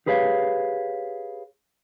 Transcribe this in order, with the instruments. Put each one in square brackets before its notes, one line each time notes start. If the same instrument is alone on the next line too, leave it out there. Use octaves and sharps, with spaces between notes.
[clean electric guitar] G4 G#4 B4 C#5 F5